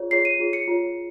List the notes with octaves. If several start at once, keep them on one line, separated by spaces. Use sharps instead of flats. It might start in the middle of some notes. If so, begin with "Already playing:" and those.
Already playing: F4 G#4 C#5
F4 G#4 C#5 C7
D#7
F4 G#4 C#5
C#7
F4 G#4 C#5